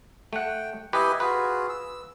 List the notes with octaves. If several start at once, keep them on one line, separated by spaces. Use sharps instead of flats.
A3 F#5 G5
E4 G4 B4 D#5 G#5
F4 F#4 G#4 B4
E6